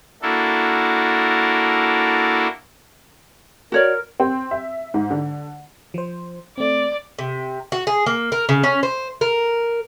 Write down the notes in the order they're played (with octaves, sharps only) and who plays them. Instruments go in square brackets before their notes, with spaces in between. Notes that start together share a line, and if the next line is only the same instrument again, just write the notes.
[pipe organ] A#3 D4 E4 F#4 A4 A#4
[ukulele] F#4 C#5 D5 [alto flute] A#4
[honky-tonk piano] C4
E5
G#2
D3
[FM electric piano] F3 C5
[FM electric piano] A3 C4 [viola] D5
[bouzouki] C3
F#4
G#4
A#3
A#4
C#3
C#4
C5
A#4